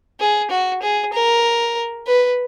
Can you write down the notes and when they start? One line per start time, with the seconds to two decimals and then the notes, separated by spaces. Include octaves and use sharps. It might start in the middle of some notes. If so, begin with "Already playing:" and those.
0.20 G#4
0.51 F#4
0.82 G#4
1.13 A#4
2.07 B4